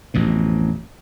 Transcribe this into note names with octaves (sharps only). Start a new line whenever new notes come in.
A1 F2 B2